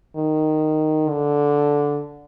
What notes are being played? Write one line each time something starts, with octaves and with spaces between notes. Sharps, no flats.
D#3
D3